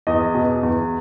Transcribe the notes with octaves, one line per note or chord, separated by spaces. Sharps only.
E2 D#5
B2
E2